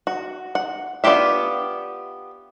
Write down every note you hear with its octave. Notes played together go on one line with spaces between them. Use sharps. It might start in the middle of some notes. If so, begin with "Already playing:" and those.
F#4
F#5
B3 D4 F4 G4 E5